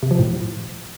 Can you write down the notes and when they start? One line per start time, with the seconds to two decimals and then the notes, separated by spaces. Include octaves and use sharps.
0.03 C3
0.11 F3
0.19 A2